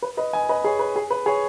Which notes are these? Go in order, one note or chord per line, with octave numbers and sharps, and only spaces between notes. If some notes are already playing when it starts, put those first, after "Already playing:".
B4
B4 D#5
D#5 G#5
B4 D#5
G#4 C#5
B4
G#4
B4
G#4 C#5